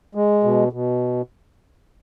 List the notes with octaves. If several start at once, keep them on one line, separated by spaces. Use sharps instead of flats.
G#3
B2
B2